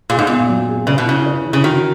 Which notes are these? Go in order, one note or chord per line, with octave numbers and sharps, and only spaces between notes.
A#2 G#4
G#2
A#2 B3
F#3
G#4
C#3 B4
B2
C#3 E4
B4
E3
C#3
D#3 F#4